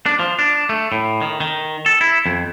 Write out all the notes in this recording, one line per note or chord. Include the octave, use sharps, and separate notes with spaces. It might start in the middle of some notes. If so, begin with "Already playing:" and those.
D4
F3
D4
A3
A2
D#3
D#3
A4
E4
F2